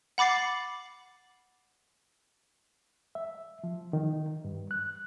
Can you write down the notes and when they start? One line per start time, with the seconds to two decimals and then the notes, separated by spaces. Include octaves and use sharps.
0.18 F#5 B5 D6 A6 C7
3.15 E5
3.64 F3
3.93 D#3
4.45 G2
4.71 F#6